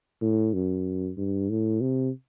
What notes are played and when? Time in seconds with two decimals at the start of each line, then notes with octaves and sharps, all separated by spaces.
0.22 A2
0.53 F#2
1.18 G2
1.50 A2
1.81 C3